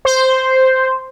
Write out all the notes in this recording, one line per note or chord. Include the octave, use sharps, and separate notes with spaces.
C5